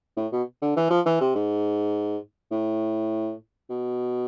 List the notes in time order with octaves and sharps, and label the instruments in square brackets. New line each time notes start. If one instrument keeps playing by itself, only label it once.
[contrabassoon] A2
B2
D3
E3
F3
E3
C3
G#2
A2
B2